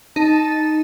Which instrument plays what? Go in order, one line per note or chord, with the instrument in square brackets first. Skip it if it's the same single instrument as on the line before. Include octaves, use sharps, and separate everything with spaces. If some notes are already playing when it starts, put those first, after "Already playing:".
[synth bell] D#4 [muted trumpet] A5